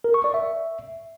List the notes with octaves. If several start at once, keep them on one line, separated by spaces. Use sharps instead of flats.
A#4
C#6
D5
E5